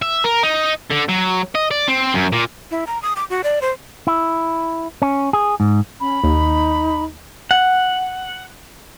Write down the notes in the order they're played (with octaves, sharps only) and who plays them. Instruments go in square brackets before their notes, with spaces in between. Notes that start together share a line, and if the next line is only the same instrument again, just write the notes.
[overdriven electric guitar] E5
A#4
D#4
D3
F#3
D#5
D5
C4
F#2
A#2
[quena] E4
A#5
D#6
D6
F#4
D5
C5
[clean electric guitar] E4
C#4
G#4
G#2
[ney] C#4 [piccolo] B5
[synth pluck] D#2 [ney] D#4
[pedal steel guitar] F#5